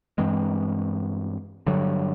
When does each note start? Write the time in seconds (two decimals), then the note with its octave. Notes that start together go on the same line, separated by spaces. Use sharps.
0.18 G2 E3 G#3 C4
1.67 G2 D3 F#3